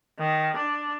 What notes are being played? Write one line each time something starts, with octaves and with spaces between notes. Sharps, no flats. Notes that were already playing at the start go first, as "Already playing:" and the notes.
D#3
D4